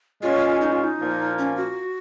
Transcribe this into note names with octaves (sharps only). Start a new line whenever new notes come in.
A#2 G#3 C#4 F4
D#4
F4
D#4
A#2 F3 A#3
C#4
F#4